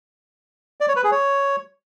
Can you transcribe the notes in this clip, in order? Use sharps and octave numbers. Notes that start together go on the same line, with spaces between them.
D5
C#5
B4
G#4
C#5